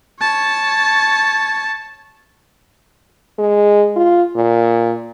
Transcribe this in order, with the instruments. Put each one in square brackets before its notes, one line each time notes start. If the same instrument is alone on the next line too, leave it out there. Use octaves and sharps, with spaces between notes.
[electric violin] C#5 A5
[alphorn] G#3
F4
A#2